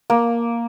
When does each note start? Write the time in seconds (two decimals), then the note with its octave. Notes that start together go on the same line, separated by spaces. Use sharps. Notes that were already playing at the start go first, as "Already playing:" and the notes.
0.10 A#3